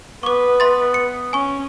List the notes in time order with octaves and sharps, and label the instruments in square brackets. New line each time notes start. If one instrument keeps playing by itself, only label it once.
[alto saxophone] B3 [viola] B4 [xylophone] C#6 D6
[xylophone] E5 C6 A6
C#7
[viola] C#4 [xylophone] G#5 C#6